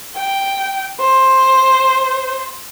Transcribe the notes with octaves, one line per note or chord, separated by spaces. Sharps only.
G5
C5